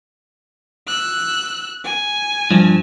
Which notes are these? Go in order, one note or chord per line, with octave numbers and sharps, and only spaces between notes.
E6 F#6
G#5
G2 F3